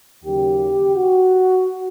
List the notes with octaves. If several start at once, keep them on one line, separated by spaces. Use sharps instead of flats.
D#2 C#3 F#3 G4
F#4